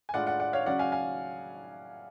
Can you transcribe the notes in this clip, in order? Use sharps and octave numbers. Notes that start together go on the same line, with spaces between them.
G#5
A2 G#3 D4 F4 D5 F#5
D5 F#5
D5 F#5
C#5 F5
C#3 F#3 C#4 D5 F#5
F5 G#5
F5 G#5